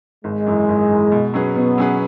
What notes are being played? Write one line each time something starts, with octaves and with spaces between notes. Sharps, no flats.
G#1 G#3
F#2 E3
G#1
F#2 E3
B2
F#3 C#4 G#4 B4
B2 B3
F#3 C#4 G#4 B4